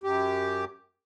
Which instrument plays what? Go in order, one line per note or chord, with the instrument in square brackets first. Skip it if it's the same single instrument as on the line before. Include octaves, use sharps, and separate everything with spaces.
[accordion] F#2 G4